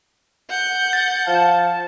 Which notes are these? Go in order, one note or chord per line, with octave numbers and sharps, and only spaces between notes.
F#5 G6
A6
F3 F5 A5